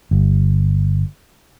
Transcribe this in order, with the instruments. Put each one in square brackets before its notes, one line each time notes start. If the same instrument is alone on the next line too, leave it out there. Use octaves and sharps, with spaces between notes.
[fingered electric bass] G1